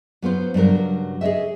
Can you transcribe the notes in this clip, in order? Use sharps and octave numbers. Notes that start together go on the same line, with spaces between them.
F#3 B3 F4 C5
G2 C#3 F#3 A#4
G#4 C#5 D#5 E5